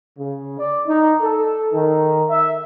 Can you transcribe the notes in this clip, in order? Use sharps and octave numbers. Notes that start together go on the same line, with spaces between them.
C#3
D5
D#4
A4
D#3
E5